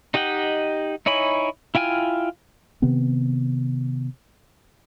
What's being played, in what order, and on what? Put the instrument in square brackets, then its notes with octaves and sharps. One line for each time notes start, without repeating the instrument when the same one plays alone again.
[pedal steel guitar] D#4 G4 D#5 F#5 G5
D#4 E4 C#5 G#5 B5
E4 F4 G5 G#5 F6
[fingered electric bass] C3 D#3 B3 C4